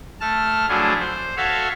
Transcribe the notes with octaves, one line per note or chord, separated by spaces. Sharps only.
A3 A5 F6
F3 F#3 A3 D4 E4 G#4
C5
F#4 A4 C#5 E5 F5